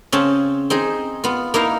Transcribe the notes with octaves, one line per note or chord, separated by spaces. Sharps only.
C#3 C4 C#4 A5
C4 D#4 G#4
B3 F4
A#3 D#4 E4 F5